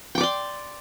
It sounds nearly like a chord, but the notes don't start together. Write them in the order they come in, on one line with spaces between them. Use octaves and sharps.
G5 D6 D5 C6